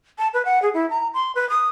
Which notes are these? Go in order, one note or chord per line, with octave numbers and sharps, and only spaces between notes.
A5
B4
F#5
G#4
E4
A#5
C6
B4
D#6